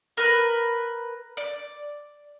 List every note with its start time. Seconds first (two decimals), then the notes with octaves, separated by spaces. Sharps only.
0.17 A#4 B4
1.37 D5